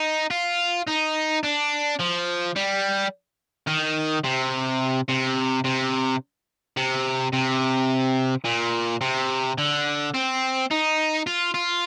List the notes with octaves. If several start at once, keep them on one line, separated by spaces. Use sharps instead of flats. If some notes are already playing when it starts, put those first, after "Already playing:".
Already playing: D#4
F4
D#4
D4
F3
G3
D#3
C3
C3
C3
C3
C3
A#2
C3
D3
C4
D#4
F4
F4